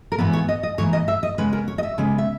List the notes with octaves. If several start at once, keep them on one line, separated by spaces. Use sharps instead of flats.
A#4
G#2 E3 B3 B4
C#5
D#5
D#5
G#2 E3 A#3 C#5
D#5
E5
D#5
C#3 G#3 B3 B4
A#4
C#5
D#5
E5
C#3 G#3 B3
E5